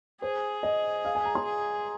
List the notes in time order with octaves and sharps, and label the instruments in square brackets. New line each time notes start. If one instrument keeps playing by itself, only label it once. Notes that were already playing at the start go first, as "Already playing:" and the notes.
[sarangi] G#4 [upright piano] C5
[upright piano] D#5
F5
G#5
A#5
C6
[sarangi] G#4